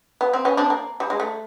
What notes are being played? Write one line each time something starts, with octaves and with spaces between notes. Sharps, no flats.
B3
C4
B3 C#4
C4 D4
A#3
G3
G#3
A3